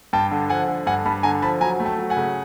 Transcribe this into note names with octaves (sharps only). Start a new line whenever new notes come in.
G2 G5 A5
D3
F3 F#5 G#5
D3
G2 F#5 G#5
G2 A5 B5
D3 G#5 A#5
F3 A5 B5
F#3 G#5 A#5
A3
G5 A5
F#3
F#5 G#5
C#3